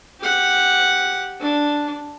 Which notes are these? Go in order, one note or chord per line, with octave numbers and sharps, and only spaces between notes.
G4 F#5
D4